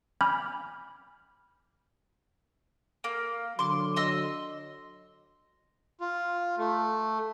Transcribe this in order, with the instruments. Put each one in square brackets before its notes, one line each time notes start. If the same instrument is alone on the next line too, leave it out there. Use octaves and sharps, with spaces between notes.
[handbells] G#5 B5 D6 F6 G6
[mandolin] A#3
[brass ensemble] D3 F#3 [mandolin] C6 D6
[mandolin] D#5 C6 E6
[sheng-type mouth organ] F4
A3